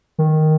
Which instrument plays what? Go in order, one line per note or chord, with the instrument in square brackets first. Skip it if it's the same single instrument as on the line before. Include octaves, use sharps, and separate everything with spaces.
[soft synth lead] D#3